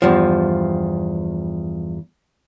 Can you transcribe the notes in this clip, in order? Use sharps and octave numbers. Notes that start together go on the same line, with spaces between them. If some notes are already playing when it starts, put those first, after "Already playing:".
E2 G2 F3